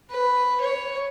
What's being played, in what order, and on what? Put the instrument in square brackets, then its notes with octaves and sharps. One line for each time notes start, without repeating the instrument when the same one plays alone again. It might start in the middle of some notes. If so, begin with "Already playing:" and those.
[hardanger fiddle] B4
C#5